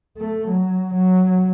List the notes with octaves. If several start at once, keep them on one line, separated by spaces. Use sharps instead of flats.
A3
F#3
F#3